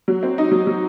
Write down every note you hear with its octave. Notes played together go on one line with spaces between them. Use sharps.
F#3
C4
D#4
F#3
F#3